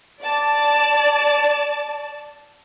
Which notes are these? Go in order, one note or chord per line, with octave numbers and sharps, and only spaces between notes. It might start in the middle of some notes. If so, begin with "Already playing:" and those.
D5 A5